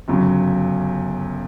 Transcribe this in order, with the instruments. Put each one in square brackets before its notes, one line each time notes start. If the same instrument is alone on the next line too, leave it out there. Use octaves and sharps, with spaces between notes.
[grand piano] G1 F#2 C#3 F#3